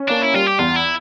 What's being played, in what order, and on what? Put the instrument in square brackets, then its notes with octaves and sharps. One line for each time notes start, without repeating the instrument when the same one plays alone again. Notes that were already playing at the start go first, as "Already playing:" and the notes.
Already playing: [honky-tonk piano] C#4
[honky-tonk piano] A#3 [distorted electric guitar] D4
[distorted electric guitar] E4
[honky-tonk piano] G3 [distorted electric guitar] F4
[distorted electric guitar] G4
[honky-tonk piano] E2 [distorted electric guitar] F4
[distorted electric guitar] E4